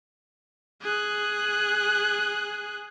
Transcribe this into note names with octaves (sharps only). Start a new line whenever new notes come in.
G#4 F#6